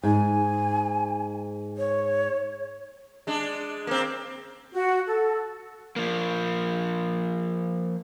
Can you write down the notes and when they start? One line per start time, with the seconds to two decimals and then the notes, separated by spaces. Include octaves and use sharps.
0.04 G#2 G#5
1.78 C#5
3.27 G#3 D4
3.87 A#3 C4
4.74 F#4
5.07 A4
5.96 F3 A#3